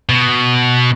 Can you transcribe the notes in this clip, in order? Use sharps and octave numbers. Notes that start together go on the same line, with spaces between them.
B2